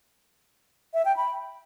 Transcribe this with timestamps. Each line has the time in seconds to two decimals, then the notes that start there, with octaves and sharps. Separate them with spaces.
0.94 E5
1.05 G5
1.17 B5